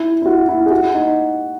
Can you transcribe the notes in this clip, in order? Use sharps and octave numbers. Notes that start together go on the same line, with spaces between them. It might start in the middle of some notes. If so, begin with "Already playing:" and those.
Already playing: E4
E4
F#4
E4
G#4
F#4
D#4